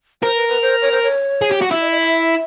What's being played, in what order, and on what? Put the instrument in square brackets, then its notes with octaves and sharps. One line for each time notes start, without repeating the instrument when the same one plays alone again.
[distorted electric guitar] A#4 [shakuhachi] C5
[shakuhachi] B4
B4
C5
C#5
C5
C#5
[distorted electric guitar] G#4
G4
F#4
E4
[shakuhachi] D#5
D#5
E5